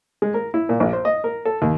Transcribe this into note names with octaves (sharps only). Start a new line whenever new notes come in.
G#3
A#4
E4
A#2
A#1
C5
D#5
A#4
A4
D#2